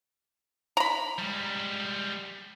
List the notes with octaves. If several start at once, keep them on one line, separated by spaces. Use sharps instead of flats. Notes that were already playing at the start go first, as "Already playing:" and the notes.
A#5 B5
G3 G#3